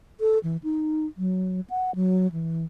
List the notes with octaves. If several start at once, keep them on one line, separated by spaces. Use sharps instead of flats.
A4
E3
D#4
F#3
F#5
F#3
E3